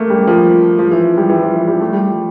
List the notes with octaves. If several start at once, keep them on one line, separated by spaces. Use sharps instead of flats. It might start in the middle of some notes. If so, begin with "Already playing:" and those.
Already playing: A3 A#3
G3
F3
F3
E3
G3
E3
F3
E3
G3
A3
G3
F3